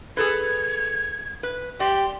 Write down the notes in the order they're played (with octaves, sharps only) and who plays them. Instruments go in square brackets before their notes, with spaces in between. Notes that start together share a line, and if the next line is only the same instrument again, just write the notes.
[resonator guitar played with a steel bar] G#4 A4 B4 [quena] G#6
[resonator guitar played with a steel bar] B4
[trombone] G4 [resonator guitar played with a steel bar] D5 [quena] C6